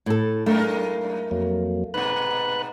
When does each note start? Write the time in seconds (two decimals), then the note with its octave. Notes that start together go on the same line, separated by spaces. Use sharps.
0.06 A2 A4
0.46 F#2 G#3 A3 A#4 F5
1.31 F2 F#3 A#3
1.94 G#2 B2 B4 B5 F#6